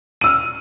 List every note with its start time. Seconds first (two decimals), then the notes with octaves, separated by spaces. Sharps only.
0.21 D#7
0.24 E6
0.26 F6